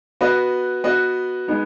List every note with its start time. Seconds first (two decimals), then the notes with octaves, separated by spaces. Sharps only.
0.21 B3 F#4 B4 D#5
0.84 B3 F#4 B4 D#5
1.48 G#3 B3 D#4